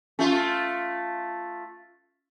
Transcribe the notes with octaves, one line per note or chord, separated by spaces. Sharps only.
A3 C#4 F4